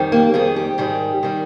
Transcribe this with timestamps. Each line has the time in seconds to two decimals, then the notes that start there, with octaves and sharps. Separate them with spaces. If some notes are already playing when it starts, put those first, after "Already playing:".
Already playing: F2 D#3 G3
0.12 A#3
0.34 F2 D#3 G3 G#4
0.56 G4
0.78 G#2 D#3 G3
1.23 D#3 G3